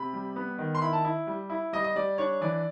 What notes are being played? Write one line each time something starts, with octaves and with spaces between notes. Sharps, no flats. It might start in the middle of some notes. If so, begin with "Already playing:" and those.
Already playing: C3 B5
G3
B3
D#3
C6
E4 B5
A5
E4
G3
E4
G3 D#5
D#5
G3 D5
D4 C#5
E3 D5